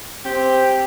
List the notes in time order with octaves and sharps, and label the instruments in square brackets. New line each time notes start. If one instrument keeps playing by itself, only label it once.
[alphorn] C4 [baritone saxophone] G4